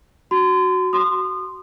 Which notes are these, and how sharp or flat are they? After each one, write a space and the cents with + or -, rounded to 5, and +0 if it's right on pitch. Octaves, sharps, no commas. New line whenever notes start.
F#4 +0 C6 -35
F#4 +15 C6 -10 D#6 -30